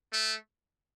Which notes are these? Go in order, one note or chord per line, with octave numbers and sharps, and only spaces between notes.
A3